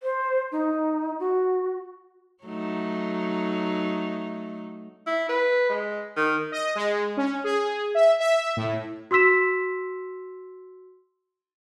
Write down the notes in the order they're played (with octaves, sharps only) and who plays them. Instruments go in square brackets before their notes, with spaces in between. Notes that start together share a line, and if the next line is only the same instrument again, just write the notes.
[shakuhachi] C5
D#4
F#4
[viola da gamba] F#3 A3 D#4
[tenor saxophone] E4
B4
G#3
D#3
[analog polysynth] D#5
G#3
C#4
G#4
E5
E5
A2
[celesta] F#4 C6 E6 B6 E7